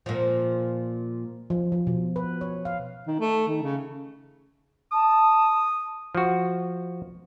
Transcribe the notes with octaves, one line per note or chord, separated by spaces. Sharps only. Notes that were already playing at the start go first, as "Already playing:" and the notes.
A#2 F3
F3
F3
B2
B4
C#5
F5
D#3
A3
D#3
C#3
A5 D#6
F3 F#4